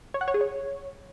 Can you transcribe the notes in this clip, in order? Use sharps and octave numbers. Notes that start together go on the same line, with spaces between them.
C#5
F#5
C#5
G#4
C#5